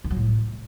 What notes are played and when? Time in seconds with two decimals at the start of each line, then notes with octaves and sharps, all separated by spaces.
0.04 D#3
0.10 F#3
0.17 A2